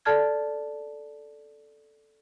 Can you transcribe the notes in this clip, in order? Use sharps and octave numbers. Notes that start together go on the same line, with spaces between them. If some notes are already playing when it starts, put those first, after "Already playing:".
A4 D5 A5 F6 G#6